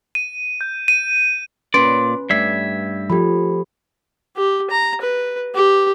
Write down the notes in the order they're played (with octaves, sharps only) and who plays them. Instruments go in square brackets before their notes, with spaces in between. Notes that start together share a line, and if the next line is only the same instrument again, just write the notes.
[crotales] D#7
G6
D#7
[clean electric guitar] A#2 D5 [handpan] C#4 B4 [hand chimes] C6
[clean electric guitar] G2 E5 [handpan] A3 D5 [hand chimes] G#6
[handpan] F3 [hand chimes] G4 A4 B5
[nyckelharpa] G4
A#5
B4
G4